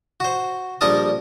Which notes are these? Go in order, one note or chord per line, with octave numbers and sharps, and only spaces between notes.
F#4 C5
A#1 G3 A4 A#4 A5 D#6